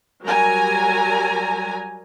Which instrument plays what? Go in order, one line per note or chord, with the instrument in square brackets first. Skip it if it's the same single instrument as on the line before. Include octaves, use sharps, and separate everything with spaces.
[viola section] F#3 G3 A#4 G#5 A#5